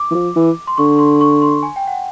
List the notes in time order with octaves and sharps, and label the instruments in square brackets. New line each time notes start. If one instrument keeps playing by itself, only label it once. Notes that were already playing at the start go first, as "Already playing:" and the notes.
Already playing: [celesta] D6
[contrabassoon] E3
F3
E3
[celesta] C6
[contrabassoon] D3 [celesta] C#6
[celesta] C6
C#6
C6
G#5
G5
F#5